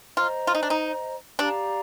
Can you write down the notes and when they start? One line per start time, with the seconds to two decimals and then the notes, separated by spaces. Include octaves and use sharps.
0.17 F4 C5 D#5 A#5
0.47 F4
0.55 D#4
0.63 D4
0.70 D#4
1.39 D4 G4 D5 F5 A#5